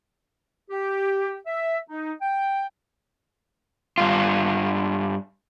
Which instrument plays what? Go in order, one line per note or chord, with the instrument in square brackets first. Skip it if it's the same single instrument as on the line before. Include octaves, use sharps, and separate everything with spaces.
[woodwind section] G4
E5
D#4
G5
[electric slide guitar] G2 F4